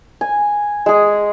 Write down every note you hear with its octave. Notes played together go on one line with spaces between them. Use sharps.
G#5
G#3 G#4